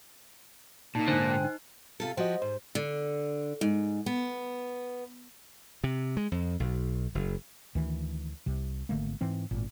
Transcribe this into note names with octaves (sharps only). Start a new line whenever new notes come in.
A#2 A#3 D#4 A5
G#2 D3 C5 G#5 F#6
G5
D#4
C3 F4 A4
F3 F#4 G4 C5 D#5
G#2 C5
D3
G#2
B3
C3
G#3
F2
B1
F#1
D2 D#3 E3
C2 C3
G#1 D3 A3 A#3
G#2 E3 C4
G#1 A#2